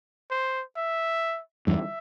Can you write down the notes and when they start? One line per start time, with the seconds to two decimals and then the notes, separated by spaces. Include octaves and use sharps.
0.31 C5
0.76 E5
1.67 E2 G2 E5